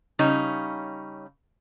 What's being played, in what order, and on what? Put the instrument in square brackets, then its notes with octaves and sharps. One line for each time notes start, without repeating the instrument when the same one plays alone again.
[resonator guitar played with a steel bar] C#3 G3 C#4 D#4 C#5